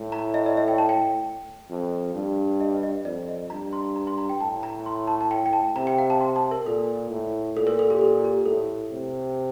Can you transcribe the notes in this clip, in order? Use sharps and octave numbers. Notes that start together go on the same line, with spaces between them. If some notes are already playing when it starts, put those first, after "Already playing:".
Already playing: A2
A#5
D#5
D5
D#5
G5
A5
G5
F2
G2
D#5
D#5
F2 D5
D#5
G2 A#5
C6
A#5
C6
A#5
G5
A2 A5
A#5
C6
A5
A5
G5
G5
A5
C3 A#5
G5
F5
A5
C6
A5
A#4
A#2 A4
A2
A#2 A4
A#4
A4
G4
A4
G4
A2 A4
C3